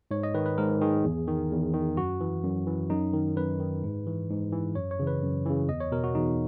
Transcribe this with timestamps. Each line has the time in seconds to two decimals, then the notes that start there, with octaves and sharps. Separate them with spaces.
0.11 G#2 C#5
0.23 D#5
0.34 D#3 B4
0.46 B4
0.58 G#2 A#4
0.81 D#3 G#4
1.04 E2
1.28 D#3
1.51 E2
1.74 D#3
1.97 F#2 F#4
2.20 E3
2.43 F#2
2.67 E3
2.90 F#2 D#4
3.13 D#3
3.37 F#2 B4
3.60 D#3
3.84 G#2
4.06 E3
4.30 G#2
4.52 E3
4.75 F#2 C#5
4.91 C#5
4.99 C#3 E3
5.07 B4
5.23 F#2
5.45 C#3 E3
5.69 E2 D#5
5.80 C#5
5.92 B2 A#4
6.04 F#4
6.15 E2 D#4